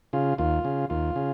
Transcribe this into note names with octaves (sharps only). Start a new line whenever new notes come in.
C#3 F4
D#2 F4
C#3
D#2 F4
C#3